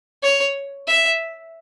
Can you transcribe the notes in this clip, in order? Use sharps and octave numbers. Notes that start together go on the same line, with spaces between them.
C#5
E5